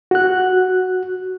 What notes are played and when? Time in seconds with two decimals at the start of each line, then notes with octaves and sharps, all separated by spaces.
0.11 F#4 F#6